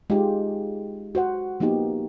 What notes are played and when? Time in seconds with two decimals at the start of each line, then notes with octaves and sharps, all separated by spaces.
0.10 G#3 D#4 F4 G4
1.15 F#4 C5 F#5
1.60 F3 A#3 B3 D#4 G4